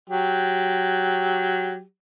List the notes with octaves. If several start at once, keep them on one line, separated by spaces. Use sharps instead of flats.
F#3 G4